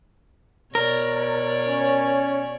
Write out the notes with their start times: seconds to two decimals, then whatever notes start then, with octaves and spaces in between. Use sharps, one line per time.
0.75 B2 A#4 C#5 D5
1.68 C#4